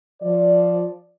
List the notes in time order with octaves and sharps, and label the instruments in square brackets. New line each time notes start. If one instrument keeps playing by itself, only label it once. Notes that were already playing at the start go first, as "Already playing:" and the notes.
[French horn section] F3 D5